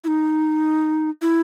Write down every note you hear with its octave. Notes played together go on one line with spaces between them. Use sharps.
E4
D#4
E4